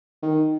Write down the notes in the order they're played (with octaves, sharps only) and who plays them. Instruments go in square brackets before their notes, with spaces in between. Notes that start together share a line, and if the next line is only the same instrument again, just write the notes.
[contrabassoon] D#3